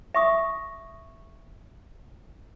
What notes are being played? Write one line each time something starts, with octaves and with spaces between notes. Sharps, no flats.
E5 C#6 D#6